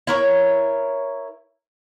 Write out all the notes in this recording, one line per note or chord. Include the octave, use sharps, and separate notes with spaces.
E4 A#4 C#5